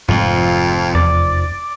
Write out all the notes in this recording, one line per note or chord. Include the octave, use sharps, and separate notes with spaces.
F1 F2 G#2 F3 F4
E2 D5